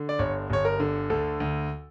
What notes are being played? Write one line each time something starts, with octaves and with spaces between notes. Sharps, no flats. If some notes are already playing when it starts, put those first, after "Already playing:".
Already playing: D3
D5
G1 C#5
G1 C#5
A#4
D3
D2 A4
D2